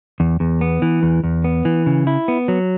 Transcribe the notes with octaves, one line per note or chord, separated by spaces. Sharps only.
E2
E2
B3
E3
E2
E2
B3
E3
C#3
E4
B3
F#3